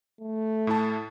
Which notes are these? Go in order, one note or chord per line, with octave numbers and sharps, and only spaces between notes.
A3
A2 E4 A5